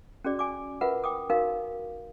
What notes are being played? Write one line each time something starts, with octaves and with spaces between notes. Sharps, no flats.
C#4 F#4 G#4 D5
G#5 D6
F4 A#4 B4 E5 F#5
G5 D6 D#6
D#4 F#4 A#4 F5